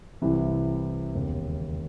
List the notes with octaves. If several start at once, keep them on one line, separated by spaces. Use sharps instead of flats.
C2 C3 E3
E1 D#2 C#3